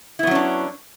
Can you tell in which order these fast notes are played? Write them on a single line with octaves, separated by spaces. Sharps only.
E4 B3 F#3 C#4 D4